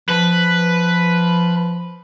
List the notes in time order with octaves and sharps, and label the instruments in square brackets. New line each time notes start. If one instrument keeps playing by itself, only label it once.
[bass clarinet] F3 [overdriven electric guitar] B4